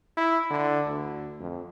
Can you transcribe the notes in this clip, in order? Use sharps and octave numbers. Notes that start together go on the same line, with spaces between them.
E4
D3
D2
F2